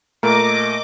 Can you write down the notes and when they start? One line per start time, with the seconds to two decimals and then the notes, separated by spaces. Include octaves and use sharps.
0.23 A#2 A3 A#4 D#5 D6